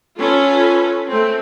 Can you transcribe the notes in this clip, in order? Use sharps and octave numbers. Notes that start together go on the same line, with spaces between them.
C#4 F4 A4 B4
A3 C4